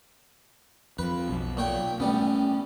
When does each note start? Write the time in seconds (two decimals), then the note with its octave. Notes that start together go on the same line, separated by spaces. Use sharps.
0.99 F2 B4
1.29 B1
1.57 A#2 C#5 G5
2.00 A1 G3 B3 C#4